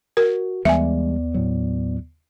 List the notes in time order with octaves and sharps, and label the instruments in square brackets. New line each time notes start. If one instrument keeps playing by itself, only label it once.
[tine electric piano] F#4 [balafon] A#4
[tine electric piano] D#2 B3 D5 [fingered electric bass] E3 G3 G#3 [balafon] E5 G#5
[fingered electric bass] A2 F#3